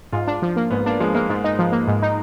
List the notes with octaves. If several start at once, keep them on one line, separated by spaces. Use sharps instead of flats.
G#2 F4
D4
F3
A#3
G#2 B3
A#3 D4
F3 G#3
G#3 A#3
G#2
D#4
F3
A#3
G#2
D#4